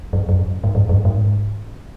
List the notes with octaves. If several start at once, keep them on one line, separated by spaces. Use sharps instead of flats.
F#2
F#2
G#2
F#2
F#2
G#2